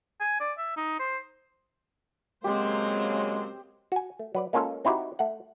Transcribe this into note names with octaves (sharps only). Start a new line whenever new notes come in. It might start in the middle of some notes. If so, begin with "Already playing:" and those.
G#5
D5
E5
D#4
C5
C#3 F#3 G#3 A#3 C4 G4 C5
F#4 G#5
A3
F#3 B4 D5
G#3 A#3 C#4 F4 A4
C4 D#4 E4 F#4 G4
A3 F#5